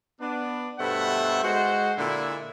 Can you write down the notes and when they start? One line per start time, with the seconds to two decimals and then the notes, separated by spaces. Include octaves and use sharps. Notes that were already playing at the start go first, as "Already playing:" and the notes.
0.20 B3 D4
0.79 G2 B2 A3 C5 E5 F#5
1.43 G#3 F#4 C5
1.97 A#2 D3 E4